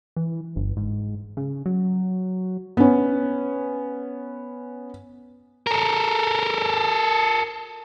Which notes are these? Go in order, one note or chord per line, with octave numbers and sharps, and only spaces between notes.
E3
G1
G#2
C#3
F#3
B3 C#4
A4 A#4